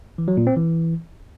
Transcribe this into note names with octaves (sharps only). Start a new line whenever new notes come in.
E3
F#3
A#2
C4
E3